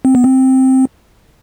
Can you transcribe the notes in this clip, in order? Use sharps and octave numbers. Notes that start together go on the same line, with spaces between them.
C4
B3
C4